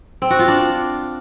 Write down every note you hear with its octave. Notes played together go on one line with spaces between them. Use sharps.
C4
F#4
F4
D4